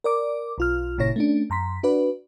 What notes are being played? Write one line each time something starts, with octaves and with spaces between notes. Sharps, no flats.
A#4 D5 D6
B1 F4 F6
G1 A#2 C#3 E4 C#5 A#6
A3 C#4 D4
F#2 A#5 C6 B6
D4 F#4 B4 D5